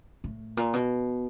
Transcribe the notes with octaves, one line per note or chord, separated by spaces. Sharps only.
A2
A#2
B2